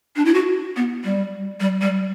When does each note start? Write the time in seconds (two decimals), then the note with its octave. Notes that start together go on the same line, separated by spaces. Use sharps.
0.16 D4
0.25 E4
0.34 F#4
0.76 B3
1.04 G3
1.60 G3
1.81 G3